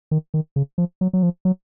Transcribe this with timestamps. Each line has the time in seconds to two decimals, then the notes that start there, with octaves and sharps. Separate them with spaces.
0.11 D#3
0.34 D#3
0.56 C#3
0.78 F3
1.01 F#3
1.13 F#3
1.23 F3
1.45 F#3